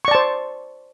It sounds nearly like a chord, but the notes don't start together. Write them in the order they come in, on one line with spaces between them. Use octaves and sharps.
C#6 D5 A5 C5